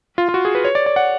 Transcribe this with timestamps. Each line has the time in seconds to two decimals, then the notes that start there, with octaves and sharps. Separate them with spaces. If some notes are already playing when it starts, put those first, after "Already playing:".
0.18 F4
0.29 F4
0.34 F#4
0.45 G#4
0.55 B4
0.65 C#5
0.75 D5
0.86 D5
0.96 F#5